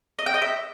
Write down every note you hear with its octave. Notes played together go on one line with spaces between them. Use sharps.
D#5
G5
D#5
E5